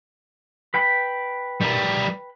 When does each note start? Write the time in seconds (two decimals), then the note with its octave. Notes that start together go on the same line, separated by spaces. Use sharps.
0.74 B4 G5 B5
1.61 G3 A#4